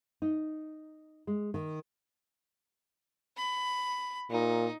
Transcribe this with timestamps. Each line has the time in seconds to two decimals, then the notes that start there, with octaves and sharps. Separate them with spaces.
0.22 D#4
1.27 G#3
1.54 D#3
3.37 B5
4.31 A#2 D#4